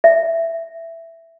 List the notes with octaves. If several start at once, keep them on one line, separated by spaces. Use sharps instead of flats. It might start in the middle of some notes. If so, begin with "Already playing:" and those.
E5